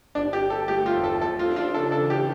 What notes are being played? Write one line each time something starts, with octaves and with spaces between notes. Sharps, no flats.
G1 D4
G4
G1
A4
A3 G4
F4
E2
A4
F3 A4
F4
D4
F4
C#3 A4
A4
E3
G4